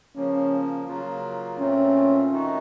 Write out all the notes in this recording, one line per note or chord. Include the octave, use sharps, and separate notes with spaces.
C#3 F3 A#3 C#4
C#3 F#3 A#3 F4
A#2 A3 C4 C#4 F4
D#3 A3 D#4 F#4